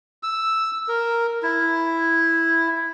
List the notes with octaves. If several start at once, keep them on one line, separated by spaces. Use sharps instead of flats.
E6
A#4
E4